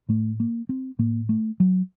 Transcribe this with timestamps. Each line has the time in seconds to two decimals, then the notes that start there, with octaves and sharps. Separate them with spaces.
0.09 A2 A3
0.40 A#3
0.69 C4
0.99 A2 A#3
1.29 A3
1.60 F#3